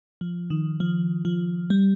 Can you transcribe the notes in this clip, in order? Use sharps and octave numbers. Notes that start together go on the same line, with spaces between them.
F3
D#3
F3
F3
G3